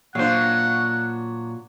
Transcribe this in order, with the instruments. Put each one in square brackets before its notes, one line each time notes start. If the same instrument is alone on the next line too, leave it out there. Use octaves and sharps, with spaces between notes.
[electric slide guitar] A#2 [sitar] F#3 D4 [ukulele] C5 F5 [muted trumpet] F#5